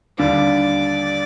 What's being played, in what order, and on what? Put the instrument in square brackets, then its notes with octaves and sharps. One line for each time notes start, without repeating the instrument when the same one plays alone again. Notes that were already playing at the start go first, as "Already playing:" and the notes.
[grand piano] D#2 D3 G3 D4 [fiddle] D5